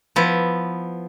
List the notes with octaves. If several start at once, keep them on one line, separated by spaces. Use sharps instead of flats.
F3 B3 E4